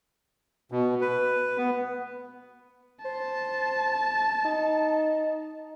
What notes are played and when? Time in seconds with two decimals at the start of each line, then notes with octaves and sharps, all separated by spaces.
0.72 B2
1.01 B4
1.58 B3
3.05 C5 A5
4.45 D#4